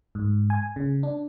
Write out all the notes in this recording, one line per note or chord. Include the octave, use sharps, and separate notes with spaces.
G#2
G#5
C#3
D4